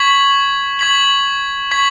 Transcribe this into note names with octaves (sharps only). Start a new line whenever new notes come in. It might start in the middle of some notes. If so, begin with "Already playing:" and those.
Already playing: C#6 G#6 B6 F#7
C#6 G#6 B6 F#7
C#6 G#6 B6 F#7